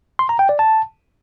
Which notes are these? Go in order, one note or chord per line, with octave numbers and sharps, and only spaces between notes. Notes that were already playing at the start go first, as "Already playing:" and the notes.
C6
A#5
G5
D5
A5